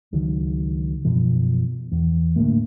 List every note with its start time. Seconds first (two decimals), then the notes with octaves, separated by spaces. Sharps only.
0.13 C#2 D#3 F#3
1.05 F#2 B2 F3
1.92 E2
2.36 D2 A2 A#3